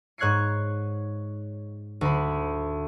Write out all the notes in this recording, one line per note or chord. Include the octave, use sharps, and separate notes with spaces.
G#2 C#5 F#6 G#6 C7 C#7
D2 B5